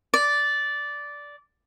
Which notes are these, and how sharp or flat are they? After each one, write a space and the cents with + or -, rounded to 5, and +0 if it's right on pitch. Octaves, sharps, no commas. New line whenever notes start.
D5 -10